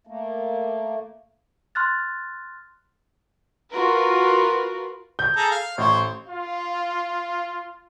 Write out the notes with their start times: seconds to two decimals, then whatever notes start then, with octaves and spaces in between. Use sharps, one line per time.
0.07 A3 A#3
1.75 C6 F6 F#6 A6
3.72 F4 F#4 A#4 B4
5.19 G6
5.36 G#4 A4 A#5
5.51 F5
5.78 A1 C5 C#5
6.30 F4 F5